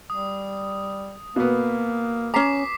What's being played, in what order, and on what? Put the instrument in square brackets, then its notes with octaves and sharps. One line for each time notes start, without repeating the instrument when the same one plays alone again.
[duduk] G3 [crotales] D#6
[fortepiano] B2 B3 [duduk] A#3
[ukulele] C#4 A#5 [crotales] D6 B6 C7